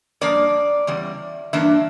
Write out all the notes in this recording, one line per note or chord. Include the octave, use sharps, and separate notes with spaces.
G2 F3 A#3 D5
E2 C#3 G3
G2 E3 A#3 D4 E5